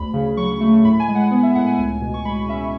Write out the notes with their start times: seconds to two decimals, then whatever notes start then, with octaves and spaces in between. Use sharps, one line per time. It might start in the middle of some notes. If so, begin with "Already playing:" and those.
Already playing: D2 B5
0.13 C#3
0.37 F#3 C#6
0.61 A3
0.84 A2 B5
1.00 G#5
1.08 G#3
1.15 F#5
1.31 B3
1.43 E5
1.55 A2 F#5
1.66 G#5
1.78 C#2 G#5
2.01 B2
2.14 C#6
2.25 G#3 B5
2.48 C#4 E5